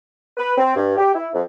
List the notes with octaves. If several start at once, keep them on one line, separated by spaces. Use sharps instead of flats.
B4
C4
G2
G4
E4
F2